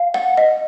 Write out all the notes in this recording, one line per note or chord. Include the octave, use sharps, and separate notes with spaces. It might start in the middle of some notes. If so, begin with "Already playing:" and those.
Already playing: F5
F#5
D#5